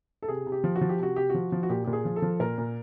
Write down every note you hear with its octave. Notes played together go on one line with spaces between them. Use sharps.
A4
C3 G#4
C3
G4
F3
F#4
F3
G4
C3 F#4
C3 G4
F3 F#4
F3
F#4
A#2 G4
A#2 G4
G#4
F3
A4
F3
A#2 A#4
A#2